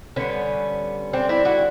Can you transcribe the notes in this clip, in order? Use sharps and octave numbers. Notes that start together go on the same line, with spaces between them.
D3 G3 B3 C#4
C4 D4
D4 E4
E4 F#4